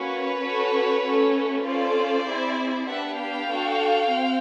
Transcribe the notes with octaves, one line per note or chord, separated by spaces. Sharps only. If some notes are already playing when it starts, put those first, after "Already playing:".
Already playing: A#3 C#4 F#4 B4 C#5
C#4 F#4 A4
A3 C#4 F#4 A4
C#4 F4 A4 C5 D5
C4 E4 G#4
B3 D4 G4 E5 F#5
F5 G5
D4 F#4 A4
C4